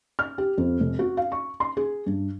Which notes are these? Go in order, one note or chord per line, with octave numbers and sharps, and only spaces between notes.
F6
G4
F2
F1
F#4
F5
C#6
C6
G#4
G2